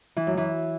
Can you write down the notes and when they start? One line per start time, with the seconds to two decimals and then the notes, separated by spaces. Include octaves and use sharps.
0.17 E3
0.27 F#2
0.37 E3